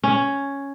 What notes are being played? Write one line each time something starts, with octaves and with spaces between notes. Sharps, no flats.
C#4